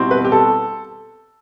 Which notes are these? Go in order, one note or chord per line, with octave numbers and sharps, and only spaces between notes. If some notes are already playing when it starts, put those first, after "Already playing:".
Already playing: B2 G3 C4 E4
B4
G4
A4